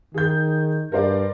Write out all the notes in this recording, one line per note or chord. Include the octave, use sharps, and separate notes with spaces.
D#3 G#4 G6
G2 A#4 C5 D5